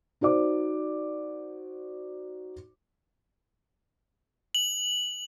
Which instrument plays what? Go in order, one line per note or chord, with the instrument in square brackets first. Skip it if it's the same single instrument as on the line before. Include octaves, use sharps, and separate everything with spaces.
[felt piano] D#4 F#4 C5 D5 D6
[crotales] F#7